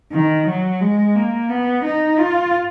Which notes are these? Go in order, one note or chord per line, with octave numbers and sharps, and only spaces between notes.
D#3
F#3
G#3
A#3
B3
D#4
F4